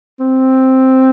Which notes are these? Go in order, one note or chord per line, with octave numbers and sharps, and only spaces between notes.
C4